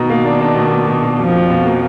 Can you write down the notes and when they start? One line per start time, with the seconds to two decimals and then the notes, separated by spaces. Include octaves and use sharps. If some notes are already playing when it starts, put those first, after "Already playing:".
Already playing: B2 D#3 D#4
0.10 A#3
0.25 D4
0.40 D4
0.56 B2
0.71 B2
0.87 B2
1.02 B2
1.19 F2 B2 F3
1.35 B2
1.50 B2
1.66 A#3